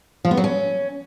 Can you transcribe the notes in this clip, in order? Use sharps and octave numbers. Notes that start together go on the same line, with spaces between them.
F3
B3
F#3
C#4